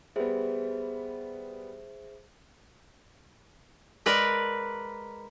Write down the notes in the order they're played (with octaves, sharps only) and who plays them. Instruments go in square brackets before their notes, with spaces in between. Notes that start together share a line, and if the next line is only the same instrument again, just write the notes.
[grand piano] G3 B3 [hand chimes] G#4 C5 E5
[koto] G#3 A#4 B4 D5